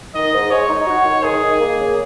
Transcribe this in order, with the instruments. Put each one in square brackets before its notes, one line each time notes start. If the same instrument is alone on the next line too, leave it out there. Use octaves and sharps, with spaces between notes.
[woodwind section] D#3 [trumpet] D#5
[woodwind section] G#2
[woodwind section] G#3 [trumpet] C#5
[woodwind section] D#4
F#4
D#3
[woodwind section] D#3 [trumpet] G#4
[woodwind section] D#3
A#3
C#3